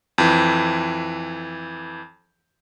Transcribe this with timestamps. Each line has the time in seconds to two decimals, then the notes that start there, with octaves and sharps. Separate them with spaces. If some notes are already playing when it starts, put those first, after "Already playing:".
0.18 F2 E3